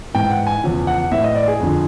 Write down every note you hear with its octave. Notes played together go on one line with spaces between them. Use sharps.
G#2 E3 G5
F#5
G#5
E2 C#3 F3
F#5
A2 E3 E5
D#5
D5
G#4
F2 D3 F3